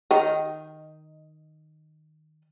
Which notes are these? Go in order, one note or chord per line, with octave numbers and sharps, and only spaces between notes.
D#3 D#4 G5